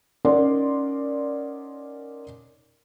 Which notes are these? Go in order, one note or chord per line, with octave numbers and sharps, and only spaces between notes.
C#4 D#4 A#4 D5 F#5 C6